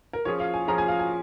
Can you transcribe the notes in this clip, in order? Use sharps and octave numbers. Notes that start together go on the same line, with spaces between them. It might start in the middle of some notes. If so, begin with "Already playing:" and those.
A#4
F3 C#4 F4 G#4 C#5
F5
G#5
F3 C#4 F4 G#4 A#5
G#5
F5
G#5